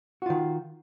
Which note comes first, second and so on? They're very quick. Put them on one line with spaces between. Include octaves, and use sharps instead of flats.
F#4 F4 D#3